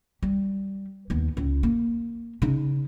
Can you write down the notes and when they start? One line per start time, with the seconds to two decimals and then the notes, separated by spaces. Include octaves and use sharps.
0.23 G3
1.10 D#2 B3
1.37 C#2
1.63 A#3
2.42 C#3 D#4